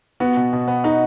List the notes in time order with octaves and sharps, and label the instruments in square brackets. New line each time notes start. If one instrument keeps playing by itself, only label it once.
[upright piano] B3 [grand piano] F#4
[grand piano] B2
B2
B3
[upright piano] D#4 [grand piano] F#4